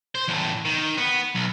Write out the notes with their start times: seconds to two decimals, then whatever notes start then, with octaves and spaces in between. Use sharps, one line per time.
0.15 C5
0.28 E2 A2
0.65 D#3
0.98 B3
1.35 B1